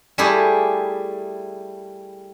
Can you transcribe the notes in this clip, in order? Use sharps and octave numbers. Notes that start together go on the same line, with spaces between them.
G3 A3 E4 G4 G#4